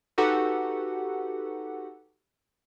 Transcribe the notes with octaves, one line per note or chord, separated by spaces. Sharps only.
D#4 F#4 G4 A4 B4 F#5